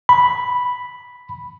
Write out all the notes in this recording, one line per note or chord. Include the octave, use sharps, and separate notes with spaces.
B5